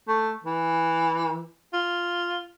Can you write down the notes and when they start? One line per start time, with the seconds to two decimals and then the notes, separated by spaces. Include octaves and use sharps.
0.08 A3
0.44 E3
1.73 F4